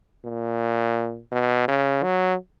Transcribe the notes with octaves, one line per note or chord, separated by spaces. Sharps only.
A#2
B2
C#3
F#3